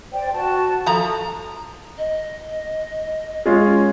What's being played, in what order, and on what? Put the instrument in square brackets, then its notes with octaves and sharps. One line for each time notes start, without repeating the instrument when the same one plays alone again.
[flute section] C5 D5 G5
F#4 A5
[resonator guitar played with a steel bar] F3 A#5 [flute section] A4 D#6
[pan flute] D#5
[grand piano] G#3 C#4 F4